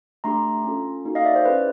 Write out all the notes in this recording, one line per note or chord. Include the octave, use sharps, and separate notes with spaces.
A3 D4 G4 A#5 C6
C#4 F4 A4
A#3 D#4 F#4 A4
D#5 F5
D5 E5
C5
C#4 E4 G#4 B4